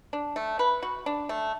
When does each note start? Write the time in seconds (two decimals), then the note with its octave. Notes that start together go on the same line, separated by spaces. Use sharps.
0.13 D4
0.36 A3
0.59 B4
0.83 F#4
1.06 D4
1.29 A3